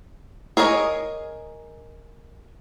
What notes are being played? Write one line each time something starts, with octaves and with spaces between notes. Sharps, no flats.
G#4 A#4 C#5 D#5